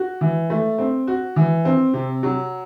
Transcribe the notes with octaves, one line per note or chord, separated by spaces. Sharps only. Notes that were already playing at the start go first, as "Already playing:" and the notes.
Already playing: F#4
E3
A3
C4
F#4
E3
C4
C3
F#3